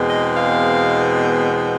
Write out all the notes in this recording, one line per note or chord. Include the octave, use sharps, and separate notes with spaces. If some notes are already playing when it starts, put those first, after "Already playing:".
Already playing: E2 B2 G#3 C4
D#5
F5